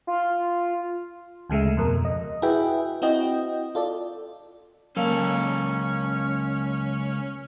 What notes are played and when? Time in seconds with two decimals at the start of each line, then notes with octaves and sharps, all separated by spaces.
0.07 F4
1.50 D2 C#3 G#3 A3 E5
1.77 F2 B2 A#4
2.05 D#5
2.42 E4 F#4 G#4 B4 E5 G5
3.02 C4 E4 F#4 D#5 G5
3.75 F4 A4 D5
4.97 C#2 F#3 A#3 C#4 A4